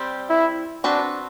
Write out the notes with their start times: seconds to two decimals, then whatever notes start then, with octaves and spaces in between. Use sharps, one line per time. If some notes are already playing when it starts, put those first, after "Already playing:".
Already playing: G3 C4 G4 C5
0.30 E4
0.84 C4 D4 F#4 B4